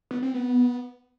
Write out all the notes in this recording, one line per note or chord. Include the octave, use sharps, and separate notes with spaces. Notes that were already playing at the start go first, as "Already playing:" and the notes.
B3
C4
B3